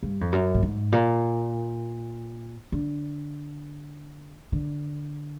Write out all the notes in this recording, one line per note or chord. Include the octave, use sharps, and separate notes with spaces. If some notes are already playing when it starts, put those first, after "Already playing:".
G2
F2
F#2
A2
G#2
A#2
D3
D3